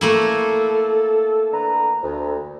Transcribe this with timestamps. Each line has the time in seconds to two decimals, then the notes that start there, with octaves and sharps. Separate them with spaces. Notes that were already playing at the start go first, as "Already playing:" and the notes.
0.01 A3 A#3 E4 A4
1.53 D3 B4 A#5
2.03 D2